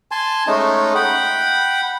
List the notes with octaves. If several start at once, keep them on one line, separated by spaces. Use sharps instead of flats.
G#5 A5 C6
G#3 A3 C#4 D#4
F#5 G5 B5